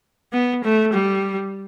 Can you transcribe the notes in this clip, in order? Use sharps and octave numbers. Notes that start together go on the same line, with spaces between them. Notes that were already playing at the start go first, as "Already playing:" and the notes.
B3
A3
G3